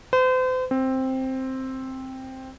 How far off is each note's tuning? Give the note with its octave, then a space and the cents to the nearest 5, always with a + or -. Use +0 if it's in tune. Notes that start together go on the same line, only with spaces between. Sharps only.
C5 -40
C4 +5